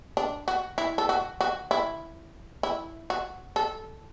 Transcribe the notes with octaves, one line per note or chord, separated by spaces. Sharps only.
D4
F#4
E4
A4
F#4
F#4
E4
E4
F#4
A4